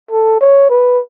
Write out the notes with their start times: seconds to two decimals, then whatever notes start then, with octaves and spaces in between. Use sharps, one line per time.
0.11 A4
0.41 C#5
0.70 B4